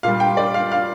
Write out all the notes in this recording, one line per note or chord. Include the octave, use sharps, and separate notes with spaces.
A#2 G3 F5
G5
D5
F5
F5